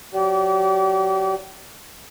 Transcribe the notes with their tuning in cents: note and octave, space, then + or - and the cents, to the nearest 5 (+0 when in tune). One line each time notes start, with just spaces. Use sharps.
F#3 -25 G4 -40 D5 -30